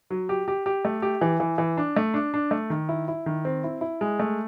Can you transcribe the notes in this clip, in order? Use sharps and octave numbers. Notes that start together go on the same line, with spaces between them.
F#3
G4
G4
G4
A3
G4
E3
E3
E3
D4
A3
D4
D4
A3
D#3
E4
E4
D#3
C4
E4
E4
G#3
A3